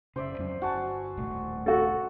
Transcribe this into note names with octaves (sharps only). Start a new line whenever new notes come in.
F#1 C#3 C5 D5 E5
F2 F#3 C#4
G1 F#4 G#5 A5
D#1 C2 A2
F#4 A4